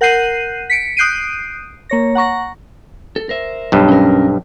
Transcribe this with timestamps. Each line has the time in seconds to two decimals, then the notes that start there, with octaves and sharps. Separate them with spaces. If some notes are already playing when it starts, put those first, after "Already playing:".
0.01 A#4 F#5 F#6 G6 C7 D#7
0.70 B6 C#7 D7
0.97 D#6 F#6 G6 C7 D7 D#7
1.90 A#3 C#5 A#6
2.15 F#5 A#5 C#6 A#6
3.16 A4
3.29 A#4 C5 E5
3.72 B1 G2
3.89 C#4 A#4